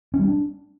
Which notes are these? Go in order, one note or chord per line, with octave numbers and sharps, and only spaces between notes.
C#4
G3
D4